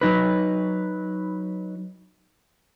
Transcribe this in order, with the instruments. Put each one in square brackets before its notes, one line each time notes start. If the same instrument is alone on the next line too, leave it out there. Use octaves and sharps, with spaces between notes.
[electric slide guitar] F#3 D#4 B4